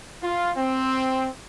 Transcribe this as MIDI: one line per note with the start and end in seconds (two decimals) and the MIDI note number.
0.22 0.51 65
0.57 1.28 60